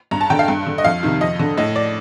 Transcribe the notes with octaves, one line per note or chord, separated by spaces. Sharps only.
G2 A#5
A5
D3 G5
F5
G2
D3
D#5
F2 F5
C3 D#3
F2 D#5
D3
A2 D#5
D5